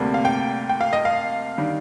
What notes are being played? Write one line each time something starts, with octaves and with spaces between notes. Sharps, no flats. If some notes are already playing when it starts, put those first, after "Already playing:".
Already playing: D2 C3 G3 A#3
F5
G5
G5
F5
D#5
F5
D#3 G3 D4